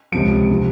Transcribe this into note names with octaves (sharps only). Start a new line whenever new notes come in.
C#2 C3 F3 D7
C3 F3